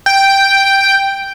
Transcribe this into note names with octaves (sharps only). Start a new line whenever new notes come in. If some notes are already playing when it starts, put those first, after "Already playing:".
G5